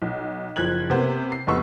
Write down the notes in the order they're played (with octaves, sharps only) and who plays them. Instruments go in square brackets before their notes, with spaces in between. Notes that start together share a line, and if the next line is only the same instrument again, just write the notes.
[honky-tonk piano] B1
F#1 F3 F#6 G#6 F#7
C3 A#3 B3 C5
C7
F1 C#2 B3 C#6 E6